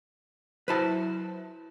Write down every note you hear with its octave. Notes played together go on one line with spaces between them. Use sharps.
F#3 E4 B4 C5 A5